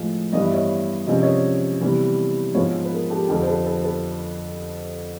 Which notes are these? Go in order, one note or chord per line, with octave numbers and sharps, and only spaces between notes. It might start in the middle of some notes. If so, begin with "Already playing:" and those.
Already playing: A2 F3 G#3
G2 E3 G3 B3 D#5
E5
C#5 D#5
C3 F3 G#3 C#4 D#5
D5
C#5 D#5
C3 E3 G3 B3
G#2 F3 G#3 B3 B4 C#5
B4
G#4 A#4
G4 A4
F2 D3 F3 G4 A4
C5
A4 B4
A4 B4
A4 B4